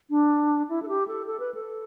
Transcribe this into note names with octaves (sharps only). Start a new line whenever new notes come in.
D4
E4
A4
G4
A4
A4
B4
A4